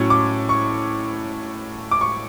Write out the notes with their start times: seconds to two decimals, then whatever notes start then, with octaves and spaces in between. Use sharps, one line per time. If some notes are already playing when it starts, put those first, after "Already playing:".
Already playing: A2 F#3 C#4 C#6
0.10 D6
0.49 C#6
1.91 D6
2.01 C#6